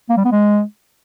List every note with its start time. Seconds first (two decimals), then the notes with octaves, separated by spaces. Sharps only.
0.10 A#3
0.17 G3
0.25 B3
0.32 G#3